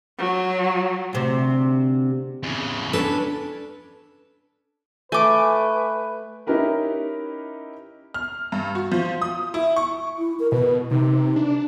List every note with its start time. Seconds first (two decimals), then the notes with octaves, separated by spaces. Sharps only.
0.18 F#3
1.13 D2 C3
2.43 E2 C#3
2.93 C#4 D4 A4 B4
5.12 A3 B4 G#5 D6
6.47 C#4 D#4 E4 G4 A#4 B4
8.14 F6
8.52 G2
8.75 F#4
8.92 F3
9.22 D#6
9.54 E4
9.76 C#6
10.18 E4
10.40 A#4
10.52 B2 B4
10.91 C3 D#4
11.36 D4